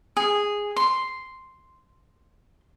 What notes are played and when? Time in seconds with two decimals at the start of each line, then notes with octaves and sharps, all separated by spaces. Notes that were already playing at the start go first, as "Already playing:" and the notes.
0.17 G#4
0.76 C6